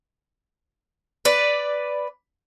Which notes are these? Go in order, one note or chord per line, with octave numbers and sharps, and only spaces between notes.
B4 D5